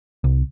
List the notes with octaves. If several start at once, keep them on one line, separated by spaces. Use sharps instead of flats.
C2